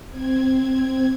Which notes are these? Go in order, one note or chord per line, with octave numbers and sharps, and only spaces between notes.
C4 G#6